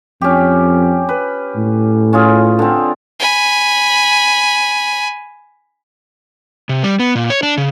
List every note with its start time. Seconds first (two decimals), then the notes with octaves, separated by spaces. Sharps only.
0.21 F2 C#4 G4
1.09 B4
1.56 A2
2.13 C#4 F4 G#4
2.59 D3 C4
3.19 G#5 B5
6.69 C3
6.83 G3
7.00 B3
7.15 A#2
7.30 C#5
7.43 D4
7.57 C#3